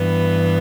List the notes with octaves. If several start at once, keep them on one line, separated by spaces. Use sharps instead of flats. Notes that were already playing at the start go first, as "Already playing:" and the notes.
Already playing: G2 E3 B3